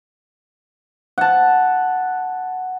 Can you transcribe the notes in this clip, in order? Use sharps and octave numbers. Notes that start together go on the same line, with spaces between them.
F#5 A5